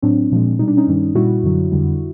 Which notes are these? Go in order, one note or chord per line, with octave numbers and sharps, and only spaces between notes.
A2 F#3 C4 D4
A#2 F3 G#3
B2 G3 D#4
D4
C#4 D#4
G2 D#3 G3
A#2 G3 E4 F#4
F#2 D3 F#3
F2 D3 G3